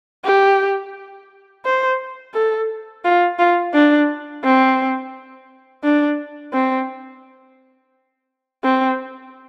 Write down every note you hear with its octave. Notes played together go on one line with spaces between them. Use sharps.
G4
C5
A4
F4
F4
D4
C4
D4
C4
C4